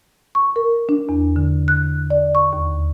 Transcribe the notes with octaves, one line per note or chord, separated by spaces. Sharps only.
C#6
A#4
D4
E2
D3
F#6
D5
C#6
D#2